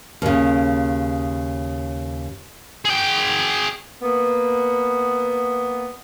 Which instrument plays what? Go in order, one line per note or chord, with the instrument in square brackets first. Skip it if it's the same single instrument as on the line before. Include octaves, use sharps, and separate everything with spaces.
[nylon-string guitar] D#2 C#3
[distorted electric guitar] G#4 G5
[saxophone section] A#3 B3